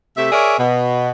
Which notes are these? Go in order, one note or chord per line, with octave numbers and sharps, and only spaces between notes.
C3 A3 E5
G#4 A#4 C#5 D5 E5
B2